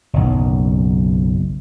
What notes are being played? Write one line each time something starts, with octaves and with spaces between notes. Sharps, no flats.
F#1 B1